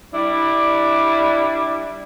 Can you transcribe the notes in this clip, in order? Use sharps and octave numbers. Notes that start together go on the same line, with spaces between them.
G3 D4 E4